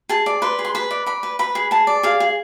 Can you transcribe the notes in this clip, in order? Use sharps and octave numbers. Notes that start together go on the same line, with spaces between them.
G#4 A5
D5
B4 C6
G#4
C6
B4 B5
D5
D5 B5
B4
B4 B5
G#4
G#4 A5
D5
G#4 F5
G#4